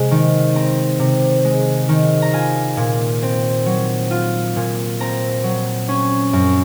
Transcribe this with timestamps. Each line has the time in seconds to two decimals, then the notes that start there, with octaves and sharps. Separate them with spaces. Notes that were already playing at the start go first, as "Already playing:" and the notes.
Already playing: C3 G#3 C4
0.11 D#3
0.55 C4 A#5
0.99 C3
1.45 G#3
1.89 D#3
2.22 A#5
2.33 F4 G#5
2.77 A#2
3.23 C4
3.66 F#3
4.11 F4
4.56 A#2
5.00 C4 A#5
5.44 F#3
5.88 C#4
6.33 F#2